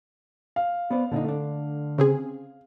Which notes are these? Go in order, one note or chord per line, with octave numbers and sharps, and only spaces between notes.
F5
B3 C5 D5
A#2 D3 D4 D#4
A3 D4
C#3 C4 G#4